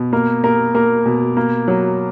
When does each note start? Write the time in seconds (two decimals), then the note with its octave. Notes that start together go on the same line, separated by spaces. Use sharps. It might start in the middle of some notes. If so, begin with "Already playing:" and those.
Already playing: B2
0.12 A#3 A#4
0.44 A#3 A#4
0.74 A#3 A#4
1.06 B2
1.37 A#3
1.68 F#3